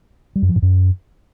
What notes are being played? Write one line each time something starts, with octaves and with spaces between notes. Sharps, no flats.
G3
F#2
F3
G#2
F#2